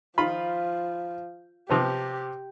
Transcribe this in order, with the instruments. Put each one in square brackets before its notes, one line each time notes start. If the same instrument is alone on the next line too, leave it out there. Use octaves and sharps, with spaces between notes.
[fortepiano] D#3 F4 B5 [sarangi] F3
[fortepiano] C3 F3 B3 [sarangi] G4